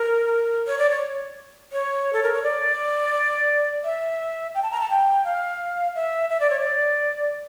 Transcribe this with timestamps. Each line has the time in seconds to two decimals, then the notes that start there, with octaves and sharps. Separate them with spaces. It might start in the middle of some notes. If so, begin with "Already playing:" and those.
Already playing: A#4
0.67 C#5
0.79 D5
0.90 C#5
1.73 C#5
2.13 A4
2.23 A#4
2.33 C#5
2.43 D5
3.84 E5
4.55 G5
4.62 A5
4.72 A#5
4.80 A5
4.90 G5
5.24 F5
5.95 E5
6.30 E5
6.40 D5
6.50 C#5
6.60 D5